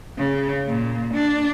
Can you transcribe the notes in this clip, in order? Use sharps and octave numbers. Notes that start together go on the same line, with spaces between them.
C#3
A#2
D4